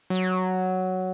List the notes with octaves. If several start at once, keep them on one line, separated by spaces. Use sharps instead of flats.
F#3